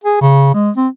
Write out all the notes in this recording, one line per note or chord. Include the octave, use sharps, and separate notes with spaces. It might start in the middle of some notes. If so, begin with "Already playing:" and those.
G#4
C#3
G#3
C4